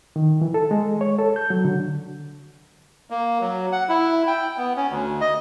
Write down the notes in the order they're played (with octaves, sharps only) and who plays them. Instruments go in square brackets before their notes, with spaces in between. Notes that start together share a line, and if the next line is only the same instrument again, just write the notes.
[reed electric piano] D#3
E3
A4
G#3
C#5
A4
G6
F#3
D3
[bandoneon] A#3
F#3
F#5
E4
G5
B3
C#4
D2
D#5